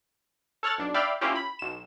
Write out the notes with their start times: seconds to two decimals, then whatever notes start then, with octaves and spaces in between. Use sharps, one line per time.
0.63 A4 C#5 F6 F#6 A6
0.78 B1 D4
0.94 D5 E5 F5 G5 B5 F6
1.21 A#3 C#4 E4 F4 G4
1.36 B5
1.59 B1 E7